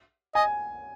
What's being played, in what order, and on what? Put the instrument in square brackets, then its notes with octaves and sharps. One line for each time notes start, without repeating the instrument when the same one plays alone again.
[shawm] D#5 [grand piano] G#5